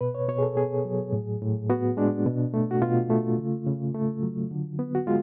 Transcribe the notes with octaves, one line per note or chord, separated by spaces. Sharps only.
B2 B4
C#5
B2 C#5
G#4
A4
B3 G#4
F#3
A2
A2
B3 F#4
G#3 D4
B2
A3
F#4
B2 F4
A3
C#3
C#3
A3
F#3
D3
B3
F#4
G#3 F4